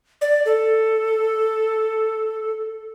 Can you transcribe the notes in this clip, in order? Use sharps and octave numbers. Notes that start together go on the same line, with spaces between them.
D5
A4